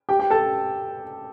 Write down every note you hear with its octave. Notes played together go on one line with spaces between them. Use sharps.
G4 G5
G4 G5
A4 A5